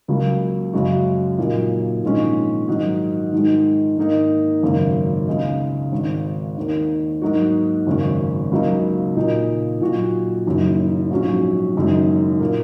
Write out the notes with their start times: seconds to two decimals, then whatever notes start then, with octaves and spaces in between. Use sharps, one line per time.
0.08 C#2 C#3 F#3 A#3
0.73 F#2 C#3 G#3 F#4
1.38 A#2 F#3 A#3 D#4
2.03 A#1 G#2 D#3 G#3 C#4
2.68 G#2 D#3 F#3 D#4
3.33 G#2 D#3 G#3
3.97 G#2 D#3 A#3 D#4
4.63 G#1 F#2 C#3 A#3
5.27 C#2 C#3 G#3 D#4
5.92 G#1 G#2 D#3
6.57 D#2 D#3 A#3
7.22 G#2 F#3 A#3 D#4 F#4
7.87 G#1 F#2 C#3 A#3 C#4
8.51 C#2 C#3 F#3 A#3 D#4
9.16 A#2 A#3 D#4
9.81 A#2 F#3 D#4 F#4
10.46 F#1 F#2 D#3
11.11 A#1 G#2 F#3 C#4 F#4
11.76 F#1 F#2 D#3 G#3 D#4
12.40 A#2 A#3